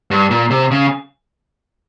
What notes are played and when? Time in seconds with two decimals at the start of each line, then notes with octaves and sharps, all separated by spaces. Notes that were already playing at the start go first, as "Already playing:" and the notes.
0.11 G2
0.30 A#2
0.50 C3
0.71 C#3